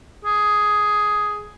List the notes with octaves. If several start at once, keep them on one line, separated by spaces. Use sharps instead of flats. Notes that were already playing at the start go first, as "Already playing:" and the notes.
G#4